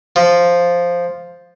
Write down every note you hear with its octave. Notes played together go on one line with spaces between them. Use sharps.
F3